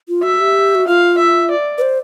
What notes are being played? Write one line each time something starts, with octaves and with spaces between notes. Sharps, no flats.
F4
F#4 E5
G4
F#4
F4 F5
E5
D5
B4
C5